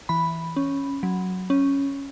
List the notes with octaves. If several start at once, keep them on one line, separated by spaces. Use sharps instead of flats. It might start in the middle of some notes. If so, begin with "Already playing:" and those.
E3 B5
C#4
F#3
C#4